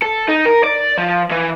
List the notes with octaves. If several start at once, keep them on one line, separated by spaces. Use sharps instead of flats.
A4
D#4
A#4
D5
F3
E3